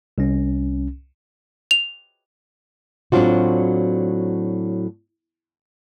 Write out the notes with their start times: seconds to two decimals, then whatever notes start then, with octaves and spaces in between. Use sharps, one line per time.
0.18 C2 C#4
1.71 F7
3.12 A2 F#3 C4 D4 F4 F#4